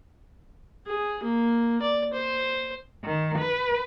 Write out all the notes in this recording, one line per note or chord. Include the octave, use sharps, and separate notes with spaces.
G#4
A#3
D5
C5
D#3
B4